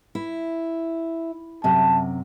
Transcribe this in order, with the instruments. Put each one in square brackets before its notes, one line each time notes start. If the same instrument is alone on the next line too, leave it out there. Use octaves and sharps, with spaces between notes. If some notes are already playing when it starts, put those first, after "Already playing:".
[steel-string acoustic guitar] E4
[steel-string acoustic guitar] F#2 C3 [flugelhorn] A5